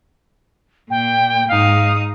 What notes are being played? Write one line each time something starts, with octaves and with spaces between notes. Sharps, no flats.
A#2 G5
G#2 D#4 F5 D#6